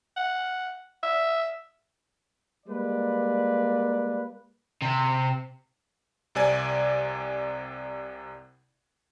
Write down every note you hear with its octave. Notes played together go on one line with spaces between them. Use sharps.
F#5
E5
G3 G#3 A#3 B4 D5
C3
C2 C3 D5 G#5